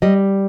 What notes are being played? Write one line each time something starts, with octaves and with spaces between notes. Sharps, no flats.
G3 D#5